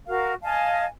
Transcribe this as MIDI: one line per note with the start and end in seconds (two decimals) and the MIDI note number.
0.08 0.33 66
0.08 0.33 70
0.08 0.33 77
0.43 0.84 75
0.43 0.84 77
0.43 0.84 80
0.43 0.84 81